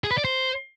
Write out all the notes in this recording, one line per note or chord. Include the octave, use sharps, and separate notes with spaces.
G#4
B4
D5
C5